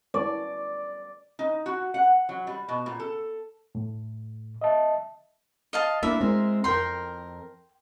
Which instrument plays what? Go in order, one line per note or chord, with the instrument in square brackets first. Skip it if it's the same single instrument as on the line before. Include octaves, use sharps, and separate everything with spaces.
[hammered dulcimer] D5
[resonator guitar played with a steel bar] D#4
F#4
F#5
F#3
G3
B2
A#2
A4
[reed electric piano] A2
D#5 E5 A5
[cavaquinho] D#5 F5 A5
[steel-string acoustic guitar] A#3 D4 E4 [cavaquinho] E5
[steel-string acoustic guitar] G#3 C4 A#4
[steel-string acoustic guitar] F2 A#4 [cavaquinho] G5 C6